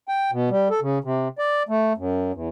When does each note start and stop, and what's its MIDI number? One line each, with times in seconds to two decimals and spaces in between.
0.08 0.31 79
0.32 0.49 47
0.50 0.68 55
0.70 0.80 69
0.82 0.99 49
1.04 1.28 48
1.38 1.63 74
1.69 1.93 57
1.97 2.32 42
2.34 2.49 40